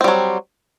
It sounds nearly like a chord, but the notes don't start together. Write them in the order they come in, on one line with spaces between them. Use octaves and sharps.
C4 G3 F#3